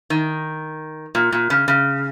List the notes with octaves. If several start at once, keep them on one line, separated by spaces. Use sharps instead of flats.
D#3
A#2
A#2
C#3
C#3